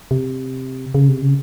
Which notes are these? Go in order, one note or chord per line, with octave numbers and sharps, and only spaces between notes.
C3
C#3
C3
C#3